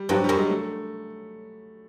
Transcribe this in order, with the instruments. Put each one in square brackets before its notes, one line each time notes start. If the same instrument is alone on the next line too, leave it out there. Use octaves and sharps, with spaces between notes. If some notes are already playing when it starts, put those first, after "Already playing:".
Already playing: [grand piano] G3
[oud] G2 [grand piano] F#3
[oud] F#2 [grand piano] G3
[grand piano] G#3
A3